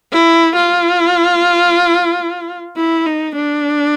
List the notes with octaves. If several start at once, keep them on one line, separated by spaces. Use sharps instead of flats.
E4
F4
E4
D#4
D4